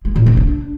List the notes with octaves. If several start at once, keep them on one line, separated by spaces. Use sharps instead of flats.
G#3
A#2
C3
D4